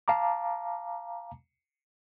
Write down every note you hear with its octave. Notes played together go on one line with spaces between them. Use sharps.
F5 A5 A#5 D6